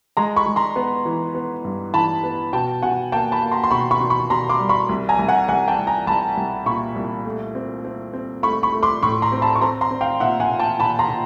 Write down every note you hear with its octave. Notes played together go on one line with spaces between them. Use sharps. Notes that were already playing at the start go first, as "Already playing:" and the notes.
G#3 A#5 C6
B5 C#6
G#3
A#5 C6
B3
E3
B3
G2
E3 A5 B5
B3
B2 G5 A5
B2 F#5 G#5
A#3 G5 A5
A5 B5
A#3
A#5 C6
C6
B2 B5 C#6
B5 C#6
B2
B5 C#6
B2 A#5 C6
C6 D6
G3
B5 C#6
C2
G#5 A#5
C2
F#5 G#5
C2 F#5 G#5
G5 A5
C2
G#5 A#5
C2 A5 B5
C2
A#2 B5 C#6
C2
A3
C4
C4
C4
A3 B5 C#6
B5 C#6
A3
C6 D6
A2 B5 C#6
A#5 C6
C4
A5 B5
C#6
C4 A#5 C6
A#5 C6
C4
F5 G5
A#2 E5 F#5
F#5 G#5
A#2
G5 A5
A#2 A5 B5
A#5 C6
A#2